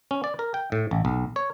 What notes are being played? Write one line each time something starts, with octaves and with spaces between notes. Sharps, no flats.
C#4
D5
A#4
G5
A2
A1
B1
C#5